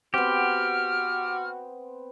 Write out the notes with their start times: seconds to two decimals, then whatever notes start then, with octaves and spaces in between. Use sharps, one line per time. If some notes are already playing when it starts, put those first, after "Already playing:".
0.14 B3 C4 F#4 G4 F6